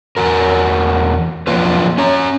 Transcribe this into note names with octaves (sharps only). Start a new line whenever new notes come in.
E2 F#4 A#4
F3 F#3 A#3 F4 B4
C#4 C#5 A#5